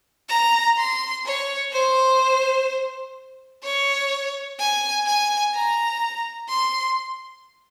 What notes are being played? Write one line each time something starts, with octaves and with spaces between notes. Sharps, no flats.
A#5
C6
C#5
C5
C#5
G#5
G#5
A#5
C6